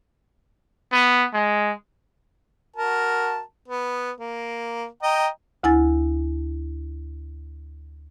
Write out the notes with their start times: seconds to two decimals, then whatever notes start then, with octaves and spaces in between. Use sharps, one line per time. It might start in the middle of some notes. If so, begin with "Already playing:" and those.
0.92 B3
1.33 G#3
2.76 F#4 A#4 A5
3.68 B3
4.20 A#3
5.03 D#5 G5 A#5
5.63 D2 E4 G#5 A6